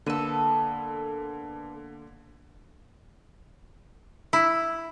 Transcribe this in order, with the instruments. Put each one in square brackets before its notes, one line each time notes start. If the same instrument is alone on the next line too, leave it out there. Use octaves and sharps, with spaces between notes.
[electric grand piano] D3 A#3 D#7 [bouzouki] B3 A4
[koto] E4